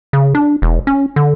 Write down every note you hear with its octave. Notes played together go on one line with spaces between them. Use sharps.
C#3
D4
E1
C#4
D3